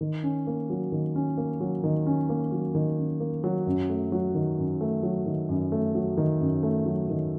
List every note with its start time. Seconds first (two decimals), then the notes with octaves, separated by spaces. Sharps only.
0.01 D#3
0.23 C#4
0.47 A#3
0.70 F#3
0.92 D#3
1.16 C#4
1.37 A#3
1.61 F#3
1.84 D#3
2.06 C#4
2.29 A#3
2.52 F#3
2.75 D#3
2.98 C#4
3.20 A#3
3.44 F#3
3.66 F#2
3.89 A3
4.12 F#3
4.35 D#3
4.58 F#2
4.81 A3
5.03 F#3
5.26 D#3
5.49 F#2
5.72 A3
5.95 F#3
6.17 D#3
6.40 F#2
6.63 A3
6.86 F#3
7.09 D#3